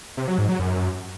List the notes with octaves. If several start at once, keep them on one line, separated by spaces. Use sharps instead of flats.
C3
F#3
G#2
F#3
F#2